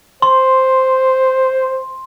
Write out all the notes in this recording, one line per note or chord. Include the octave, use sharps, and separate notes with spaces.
C5 C6